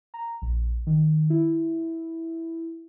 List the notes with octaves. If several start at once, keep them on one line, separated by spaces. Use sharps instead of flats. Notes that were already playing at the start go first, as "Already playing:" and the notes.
A#5
A#1
D#3
E4